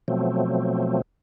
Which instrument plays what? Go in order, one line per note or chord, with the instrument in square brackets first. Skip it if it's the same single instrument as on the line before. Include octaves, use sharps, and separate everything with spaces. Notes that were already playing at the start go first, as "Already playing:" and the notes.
[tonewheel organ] B2 F3 F#3 A3 C4